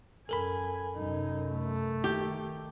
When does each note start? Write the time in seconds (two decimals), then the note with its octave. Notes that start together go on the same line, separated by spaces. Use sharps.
0.29 F#2 A4 A#4 G#5 B5
0.96 F#2 C3 D#4
1.51 A3
2.04 D#3 G4